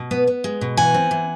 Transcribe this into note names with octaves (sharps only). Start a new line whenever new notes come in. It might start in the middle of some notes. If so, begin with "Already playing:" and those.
Already playing: B2
B3
B3
G#3
B2
E3 F#5 G#5
C4
E3